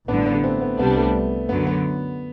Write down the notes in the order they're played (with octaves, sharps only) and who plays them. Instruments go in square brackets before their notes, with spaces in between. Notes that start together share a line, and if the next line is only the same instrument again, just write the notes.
[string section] A1 G2 D3 [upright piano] B3 D4
[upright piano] B3 D4
A3 C4
B3
[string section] C2 C3 G3 D4 [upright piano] B3
[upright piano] A3
[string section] F#2 D3 F#3 [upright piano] B3
[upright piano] B3